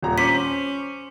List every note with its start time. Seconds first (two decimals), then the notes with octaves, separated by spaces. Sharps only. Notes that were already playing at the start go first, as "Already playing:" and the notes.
0.02 D#1 A#5
0.18 C#4 C5 D6 B6